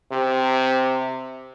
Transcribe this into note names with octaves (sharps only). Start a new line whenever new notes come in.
C3